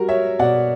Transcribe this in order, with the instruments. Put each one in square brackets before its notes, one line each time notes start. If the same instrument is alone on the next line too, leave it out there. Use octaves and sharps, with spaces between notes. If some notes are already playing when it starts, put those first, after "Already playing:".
Already playing: [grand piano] G3 F#4 A#4
C#5 E5
B2 D5 F#5